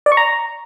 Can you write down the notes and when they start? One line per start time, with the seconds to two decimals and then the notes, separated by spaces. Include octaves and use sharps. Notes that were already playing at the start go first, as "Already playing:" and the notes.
0.06 D5
0.12 C#6
0.17 A#5